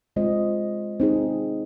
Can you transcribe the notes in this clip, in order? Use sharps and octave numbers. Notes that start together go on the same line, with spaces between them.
G#3 C4 F4 C5 D#5
C4 D#4 G#4